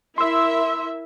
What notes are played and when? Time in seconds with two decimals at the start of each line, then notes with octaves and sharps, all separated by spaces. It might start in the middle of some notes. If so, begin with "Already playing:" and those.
0.18 E4 A#4 E5 C6 E6